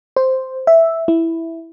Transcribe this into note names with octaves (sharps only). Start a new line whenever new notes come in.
C5
E5
E4